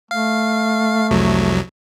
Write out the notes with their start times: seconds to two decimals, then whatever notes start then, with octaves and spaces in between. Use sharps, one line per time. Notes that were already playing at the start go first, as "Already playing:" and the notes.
0.11 A3 F5
1.11 C2 F2 F#3